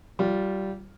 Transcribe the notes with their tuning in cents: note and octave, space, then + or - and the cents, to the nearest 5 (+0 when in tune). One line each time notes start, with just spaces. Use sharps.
G3 -20 F4 +0